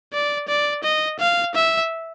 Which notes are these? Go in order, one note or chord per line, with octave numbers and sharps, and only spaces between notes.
D5
D5
D#5
F5
E5